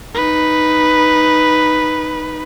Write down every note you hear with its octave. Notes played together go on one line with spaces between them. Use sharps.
D#4 B4